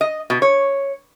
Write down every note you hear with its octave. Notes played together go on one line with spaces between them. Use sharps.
D#5
B2
C#5